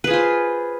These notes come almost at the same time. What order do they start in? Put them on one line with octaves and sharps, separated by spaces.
B4 G#4 F4 C5